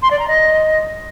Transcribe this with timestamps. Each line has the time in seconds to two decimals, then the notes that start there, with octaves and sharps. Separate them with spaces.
0.02 C6
0.10 D5
0.19 A#5
0.27 D#5